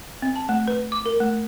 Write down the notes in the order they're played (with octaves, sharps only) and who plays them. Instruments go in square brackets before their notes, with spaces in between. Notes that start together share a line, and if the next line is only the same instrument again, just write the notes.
[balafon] C4
A5
A3
B4
D6
A#4
A3